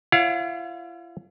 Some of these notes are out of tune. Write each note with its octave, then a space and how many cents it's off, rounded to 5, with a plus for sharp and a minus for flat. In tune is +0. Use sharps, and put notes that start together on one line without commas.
E4 +45 C#5 +0 F5 +40